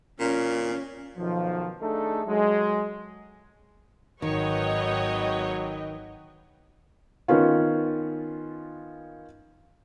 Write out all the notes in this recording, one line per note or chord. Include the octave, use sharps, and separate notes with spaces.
A#2 C#4
B1 D#3 F3
A3 D4 D#4 G#4 A4
F#3 G#3
G#1 D#3 F#3 B4 C#5 D#5 G5
D#3 B3 C#4 F4